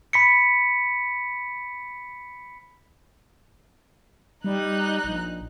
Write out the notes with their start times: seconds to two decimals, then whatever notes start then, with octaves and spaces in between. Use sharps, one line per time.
0.13 B5 B6 C#7
4.44 G3 D#4 F#6
5.04 A#1